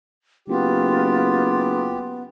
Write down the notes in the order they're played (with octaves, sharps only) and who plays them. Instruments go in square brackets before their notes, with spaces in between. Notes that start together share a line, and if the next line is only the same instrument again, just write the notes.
[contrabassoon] F#1 [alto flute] B3 [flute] F4 [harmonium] G4